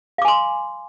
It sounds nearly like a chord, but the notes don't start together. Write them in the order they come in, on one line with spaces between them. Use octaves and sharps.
F5 D6 G#5 C6